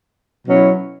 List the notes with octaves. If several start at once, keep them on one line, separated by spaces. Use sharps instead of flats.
B2 F#3 C#4 E4